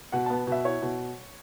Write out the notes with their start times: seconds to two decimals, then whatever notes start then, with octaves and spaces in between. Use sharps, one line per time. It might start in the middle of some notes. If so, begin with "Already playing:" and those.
0.12 B2 F#5
0.26 B3 A5
0.47 B2 E5
0.64 E4 C#5
0.82 B2